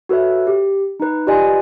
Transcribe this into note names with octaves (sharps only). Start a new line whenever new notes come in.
F#4 A4 B4 C#5 E5
G4
D#4 B4
F4 G4 B4 D5 D#5 G#5